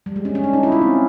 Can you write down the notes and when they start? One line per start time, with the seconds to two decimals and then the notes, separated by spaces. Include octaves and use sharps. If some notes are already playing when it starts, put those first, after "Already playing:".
0.06 G3
0.16 G#3
0.25 C#4
0.35 C#4
0.44 D4
0.53 D#4
0.63 E4
0.72 F4
0.82 C4